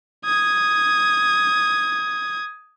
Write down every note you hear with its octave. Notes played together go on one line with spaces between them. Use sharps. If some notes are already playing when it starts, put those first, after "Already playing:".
D#6 G#6